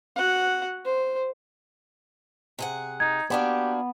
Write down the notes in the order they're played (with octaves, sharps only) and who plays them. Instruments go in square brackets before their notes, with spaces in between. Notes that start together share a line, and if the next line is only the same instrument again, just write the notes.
[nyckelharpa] F#4 F#5
C5
[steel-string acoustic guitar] C3 G#4 F#5
[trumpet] D#4 [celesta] G#6
[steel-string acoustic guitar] A#3 D4 F#4 [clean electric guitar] B3 [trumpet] G4